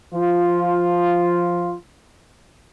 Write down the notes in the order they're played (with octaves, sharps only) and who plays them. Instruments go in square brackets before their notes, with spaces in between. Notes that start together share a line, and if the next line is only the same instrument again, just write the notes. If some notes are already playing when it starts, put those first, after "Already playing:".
[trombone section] F3 F4